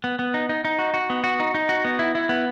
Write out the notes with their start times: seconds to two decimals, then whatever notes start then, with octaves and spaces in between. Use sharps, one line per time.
0.04 B3
0.19 B3
0.34 D#4
0.49 D#4
0.65 D#4
0.79 F#4
0.94 F#4
1.10 B3
1.24 F#4
1.40 D#4
1.54 D#4
1.69 F#4
1.85 B3
1.99 E4
2.15 E4
2.29 B3